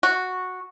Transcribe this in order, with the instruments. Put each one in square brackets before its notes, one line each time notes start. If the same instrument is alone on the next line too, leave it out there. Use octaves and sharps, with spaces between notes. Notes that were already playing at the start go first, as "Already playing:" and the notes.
[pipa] F#4